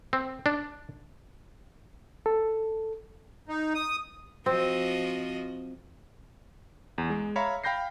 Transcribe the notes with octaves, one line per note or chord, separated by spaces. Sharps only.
C4
D4
A4
D#4
D#6
F3 C4 F#4 D#5
E2
G#3
C#5 E5 F5 A#5 B5
F5 G5 B5 G6 A#6 C7